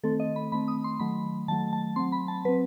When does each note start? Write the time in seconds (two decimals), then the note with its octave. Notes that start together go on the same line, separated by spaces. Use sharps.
0.03 D#3 A3 C4 A4
0.20 D#5
0.36 B5
0.52 D#3 A3 C4 B5
0.68 D#6
0.84 C6
0.99 D#3 F#3 A3 B5
1.48 D#3 F#3 A3 A5
1.73 A5
1.96 F#3 C4 C6
2.12 B5
2.28 A5
2.45 F#3 C4 B4